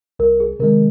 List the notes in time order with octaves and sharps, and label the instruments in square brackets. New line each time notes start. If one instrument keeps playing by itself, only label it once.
[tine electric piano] C2 [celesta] A#4
[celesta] G#4
[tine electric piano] C3 D#3 G#3 [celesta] A#4